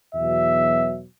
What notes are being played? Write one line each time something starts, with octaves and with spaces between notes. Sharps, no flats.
E2 B2 F#3 E5